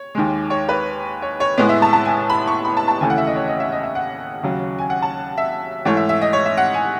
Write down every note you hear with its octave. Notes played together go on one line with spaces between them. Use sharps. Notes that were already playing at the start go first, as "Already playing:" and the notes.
Already playing: C#5
D#2 D#3 G#3
C#5
B4
C#5
C#5
A2 G#3 B3
E5
A5
A5
G#5
B5
C#6
B5
A5
A5
D#2 C#3 E3 A3 G#5
F#5
E5
D#5
C#5
D#5
E5
D#5
E5
F#5
D#2 C#3 F#3
G#5
F#5
A5
E5
G#2 E3 A3 C#5
E5
E5
D#5
C#5
E5
F#5
G#5